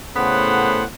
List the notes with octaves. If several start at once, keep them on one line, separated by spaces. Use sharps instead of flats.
A2 C#3 A3 B3 C5 F#5